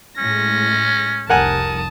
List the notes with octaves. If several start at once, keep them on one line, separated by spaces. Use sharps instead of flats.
A2 G#3 C#4 A#6
F1 C2 A#4 F#5 G#5 A5 D#6